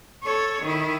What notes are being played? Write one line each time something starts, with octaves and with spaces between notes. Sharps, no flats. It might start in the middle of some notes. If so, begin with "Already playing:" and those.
A4 C#5
D#3 E4